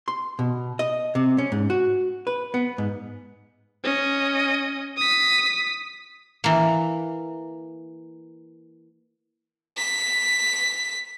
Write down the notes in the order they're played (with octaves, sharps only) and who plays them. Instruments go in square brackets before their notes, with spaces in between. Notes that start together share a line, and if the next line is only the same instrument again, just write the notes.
[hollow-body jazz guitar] C6
B2
D#5
C3
C#4
G#2
F#4
B4
B3
G#2
[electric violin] C#4 D#5
D#6 B6
[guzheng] E3 A#3
[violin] B6